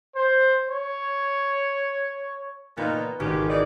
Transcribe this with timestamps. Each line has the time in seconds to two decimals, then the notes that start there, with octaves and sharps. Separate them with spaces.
0.15 C5
0.69 C#5
2.77 A#2 B3 D#4
3.20 G#1 G#2 C#4 G4
3.49 E3 D#4 D5